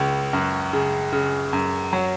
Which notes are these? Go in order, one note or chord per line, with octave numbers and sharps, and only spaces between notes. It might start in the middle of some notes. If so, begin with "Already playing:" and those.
Already playing: C#2 C#3
F#2
C#3
C#3
F#2
F#3